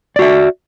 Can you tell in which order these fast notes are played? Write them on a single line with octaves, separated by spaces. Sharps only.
D5 F#4 E5